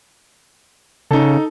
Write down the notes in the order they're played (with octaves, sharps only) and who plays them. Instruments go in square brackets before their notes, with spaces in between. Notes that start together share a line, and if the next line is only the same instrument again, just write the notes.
[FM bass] C#3 [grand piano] D#4 A4